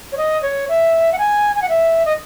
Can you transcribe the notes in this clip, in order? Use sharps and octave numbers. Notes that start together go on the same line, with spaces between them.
C#5
D#5
C#5
E5
F#5
G#5
G#5
F#5
E5
D#5